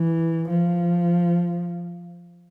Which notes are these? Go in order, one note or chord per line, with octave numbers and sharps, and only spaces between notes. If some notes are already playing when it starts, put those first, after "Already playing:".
Already playing: E3
F3